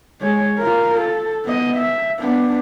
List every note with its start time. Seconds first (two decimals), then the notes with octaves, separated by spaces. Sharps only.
0.21 G#3 C#5
0.59 F4 A#4
1.01 A4
1.44 B3 D#5
1.77 E5
2.19 B3 D4